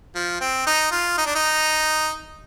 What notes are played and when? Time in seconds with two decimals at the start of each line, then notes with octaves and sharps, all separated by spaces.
0.16 F3
0.41 C4
0.67 D#4
0.92 F4
1.18 D#4
1.26 D4
1.35 D#4